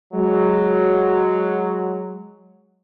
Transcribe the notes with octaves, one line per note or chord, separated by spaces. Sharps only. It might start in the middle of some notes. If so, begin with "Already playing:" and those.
F#3 G#3